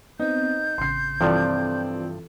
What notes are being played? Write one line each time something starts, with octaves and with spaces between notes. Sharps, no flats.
B3 C4 D#4 G6
A1 C#3 C6 C7
G2 C3 E3 F3 C4 F4 A4 D5